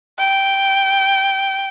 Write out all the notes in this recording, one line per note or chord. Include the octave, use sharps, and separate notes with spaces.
G5